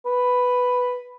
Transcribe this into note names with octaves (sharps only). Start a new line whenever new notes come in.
B4